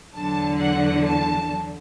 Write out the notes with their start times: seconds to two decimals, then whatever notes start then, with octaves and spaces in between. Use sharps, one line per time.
0.14 E2 D3 F#3 A5
0.59 F#5
1.05 A5